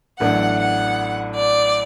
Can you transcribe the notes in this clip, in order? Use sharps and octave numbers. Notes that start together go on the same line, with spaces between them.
A1 A2 F#3 B3 D4 F#5
F#5
D5